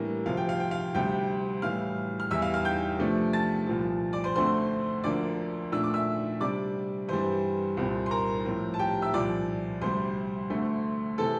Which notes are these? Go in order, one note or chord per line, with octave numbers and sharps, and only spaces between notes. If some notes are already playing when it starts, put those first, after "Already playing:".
Already playing: A2 E3 G3 A#3 D4 A#4
D2 C3 F3 F5
G5
F5
G5
F5
D2 C3 G3 G4 G5
A2 E3 G3 F5 F6
F6
E2 E3 G3 E5 E6
F5 F6
F5 F6
G5 G6
C3 F3 A3 D4
A5 A6
C2 A#2 F3
D5 D6
C5 C6
D2 D3 A3 C4 C5 C6
D2 D3 F3 A#3 D4 D5 D6
A#2 A3 D4 E6
D6
E5 E6
C3 G3 D4 D5 D6
G2 E3 G3 C5 C6
C2 A#2 G3 C4
C6
A#4 A#5
A2 F3 C4
A5
G4 G5
E5 E6
C2 A#2 F3 D5 D6
D2 C3 G3 C5 C6
D2 D3 A3
C3 E3 A4 A5